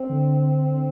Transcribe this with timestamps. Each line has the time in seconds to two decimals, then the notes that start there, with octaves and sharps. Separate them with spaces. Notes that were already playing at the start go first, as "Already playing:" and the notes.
Already playing: C4
0.09 D3